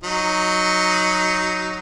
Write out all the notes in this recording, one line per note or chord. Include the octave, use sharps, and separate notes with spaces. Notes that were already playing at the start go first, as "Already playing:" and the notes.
F#3 D#4